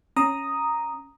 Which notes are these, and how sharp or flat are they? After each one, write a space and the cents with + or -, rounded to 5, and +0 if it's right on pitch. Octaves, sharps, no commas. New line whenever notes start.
C#4 +0 A#5 +0 D#6 +0